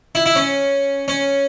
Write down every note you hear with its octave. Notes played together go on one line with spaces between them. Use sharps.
E4
E4
C#4
C#4